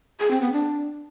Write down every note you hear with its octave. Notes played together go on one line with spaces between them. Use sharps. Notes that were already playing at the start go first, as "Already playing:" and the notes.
G#4
C4
B3
D4